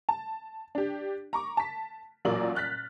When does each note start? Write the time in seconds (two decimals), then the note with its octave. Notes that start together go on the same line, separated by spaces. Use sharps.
0.09 A5
0.75 D4 G4
1.33 A#5 C#6 D6
1.57 A5 B6
2.25 A1 A#2 F#3 A#3 D5 F#7
2.55 F6 F#6 A6 B6